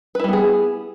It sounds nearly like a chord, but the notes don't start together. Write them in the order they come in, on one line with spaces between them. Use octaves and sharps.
B4 E4 G3 B3 G#4